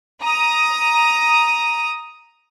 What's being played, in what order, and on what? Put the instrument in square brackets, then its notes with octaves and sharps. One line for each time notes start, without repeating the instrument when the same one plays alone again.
[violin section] A#5 D#6